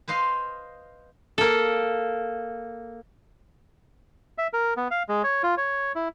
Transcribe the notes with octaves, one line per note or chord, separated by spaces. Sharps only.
B4 C5 D#5 F5
A#3 A4
E5
A#4
B3
F5
G#3
C#5
F4
C#5
E4